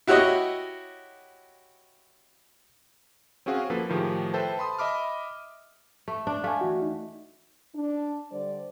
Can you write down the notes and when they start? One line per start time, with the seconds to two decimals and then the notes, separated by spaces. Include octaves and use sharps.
0.07 E4 F#4 G4 C#5 D#5
3.46 C4 C#4 F#4 G#4 F5 F#5
3.70 F3 A#3 A4 B4
3.89 A2 D#3 F3 D#4 G4 G#4
4.33 A4 B4 C5 E5 G5 A5
4.58 A5 B5 C6 D#6
4.79 D#5 E5 B5 D6 F6
6.08 A3
6.27 D4
6.44 A3 F5 G#5
6.61 E3 F#4
6.82 D#4
7.75 D4
8.32 D3 G3 C5 D5